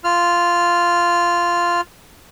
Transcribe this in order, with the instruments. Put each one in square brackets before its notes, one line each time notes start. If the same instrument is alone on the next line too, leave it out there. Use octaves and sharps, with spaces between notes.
[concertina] F4 F6